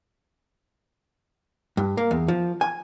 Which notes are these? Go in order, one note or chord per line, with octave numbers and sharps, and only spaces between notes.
G2
A#3
E2
F3
G#5